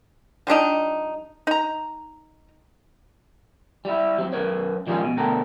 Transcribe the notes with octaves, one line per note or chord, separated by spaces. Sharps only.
F3 G3 D4 D#4
D#4 A#5
G3 E4
F#3 C4
F#2 A#4 B4 C#5
D#3 F3 G3 G#3 C#4
B2
D2 B2 A4 A#4 G5